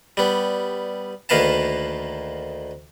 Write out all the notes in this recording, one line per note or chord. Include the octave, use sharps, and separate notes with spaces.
G3 B3
D2 D#3 A#3 B4 F5 A5